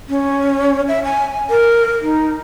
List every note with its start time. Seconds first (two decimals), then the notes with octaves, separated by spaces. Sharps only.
0.09 C#4
0.88 E5
1.04 G#5
1.50 A#4
2.01 D#4